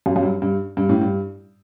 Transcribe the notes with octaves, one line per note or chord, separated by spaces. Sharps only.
F#2
F#2
G2
G2
G2
A2
G2